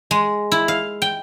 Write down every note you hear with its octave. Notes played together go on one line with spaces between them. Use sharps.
G#3
E4
F5
G5